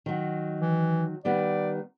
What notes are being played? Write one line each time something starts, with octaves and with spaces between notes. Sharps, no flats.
D#3 F#3
E3
D#3 G3 B3 D5